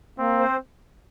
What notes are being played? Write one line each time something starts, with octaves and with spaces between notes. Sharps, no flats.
A#3 C4
C5